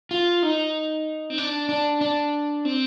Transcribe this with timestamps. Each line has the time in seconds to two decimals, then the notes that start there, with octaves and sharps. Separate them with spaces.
0.11 F4
0.43 D#4
1.30 C4
1.38 D4
1.69 D4
2.01 D4
2.65 C4